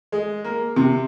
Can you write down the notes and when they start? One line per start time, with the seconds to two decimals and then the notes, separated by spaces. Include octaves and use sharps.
0.12 G#3
0.44 A#3
0.76 C3